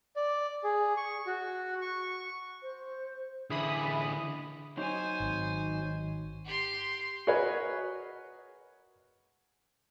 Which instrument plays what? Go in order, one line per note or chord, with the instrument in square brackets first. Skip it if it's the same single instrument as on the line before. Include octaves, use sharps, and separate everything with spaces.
[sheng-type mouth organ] D5
G#4
C#6
F#4
C#6
[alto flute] C5
[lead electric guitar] D3 E3 [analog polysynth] G#4 B5 D#6 [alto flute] E5
[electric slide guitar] F#3 D#4 C#5 [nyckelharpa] C5 G#5
[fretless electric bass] G#1
[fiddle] G4 C6
[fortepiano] F#4 G#4 A#4 B4 C#5 D#5